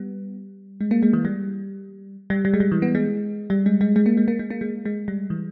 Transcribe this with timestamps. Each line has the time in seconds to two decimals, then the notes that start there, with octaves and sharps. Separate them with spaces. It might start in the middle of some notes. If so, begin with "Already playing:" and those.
Already playing: G3 B3
0.81 G#3
0.91 A#3
1.03 G#3
1.13 E3
1.25 G3
2.30 G3
2.45 G3
2.54 G#3
2.60 G3
2.72 E3
2.82 B3
2.95 G#3
3.50 G3
3.66 G#3
3.81 G#3
3.96 G#3
4.06 A#3
4.17 G#3
4.28 A#3
4.39 G#3
4.50 A#3
4.61 G#3
4.85 G#3
5.08 G3
5.30 E3